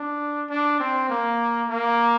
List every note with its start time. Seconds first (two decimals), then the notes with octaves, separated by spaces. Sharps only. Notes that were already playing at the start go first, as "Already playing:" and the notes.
Already playing: D4
0.49 D4
0.80 C4
1.10 A#3
1.70 A#3